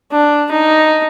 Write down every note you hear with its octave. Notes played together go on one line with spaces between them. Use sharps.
D4
D#4